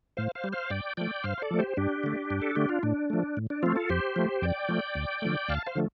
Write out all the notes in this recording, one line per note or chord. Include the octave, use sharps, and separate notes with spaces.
A2 C5 F5
C5 F5
G3
C5 F5
G2 D5 G5
F3 A3 D5 G5
G2 C5 F5
C5
A4 D5
F3 A3
G4 C5
G2 D4 G4
D3 A3
G2
A4
D3 A3 G4
F4
A2 D4
F3 A3
A2
D4
F3 A3 C4 F4
F4 A4
F2 G4 C5
F3 A3
F2 D5 G5
F3 A3
D2
D3 F3 A3
D2 F5 A5
C5 F5
D3 F3 A3